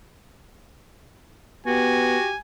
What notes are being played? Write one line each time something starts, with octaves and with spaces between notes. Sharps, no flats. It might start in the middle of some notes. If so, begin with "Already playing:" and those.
B3 F#4 G4 G#5